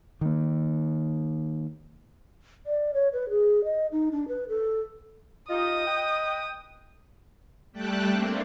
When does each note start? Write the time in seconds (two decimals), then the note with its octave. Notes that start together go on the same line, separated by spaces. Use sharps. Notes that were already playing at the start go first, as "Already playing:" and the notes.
0.21 D#3 A#3
2.66 D5
2.94 C#5
3.13 B4
3.30 G#4
3.65 D#5
3.92 D#4
4.12 D4
4.28 B4
4.49 A4
5.50 D#4 F4 G4 D#5 D#6
5.86 B4 G5
7.72 G3 A3 G5 A5 F#6
8.11 A3 A#3 C4 D4